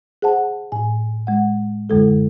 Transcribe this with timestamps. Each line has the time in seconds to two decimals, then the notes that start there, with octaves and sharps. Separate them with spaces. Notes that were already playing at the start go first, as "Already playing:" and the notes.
0.22 G#4 C5 F#5 A5
0.72 A2 G#5
1.27 G#3 F#5
1.90 F#2 D3 G#3 A4